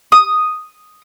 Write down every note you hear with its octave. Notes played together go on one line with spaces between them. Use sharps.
D#6